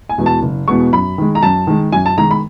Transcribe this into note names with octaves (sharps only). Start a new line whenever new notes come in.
G#5
E2 B2 G#3 B3
A5
F#1
E2 B2 G#3 B3 C#6
F#2 B5
D#3 G#3
A#5
F#2 A5
D#3 G#3
F#2 G#5
A5
D#3 G#3 A#5
B5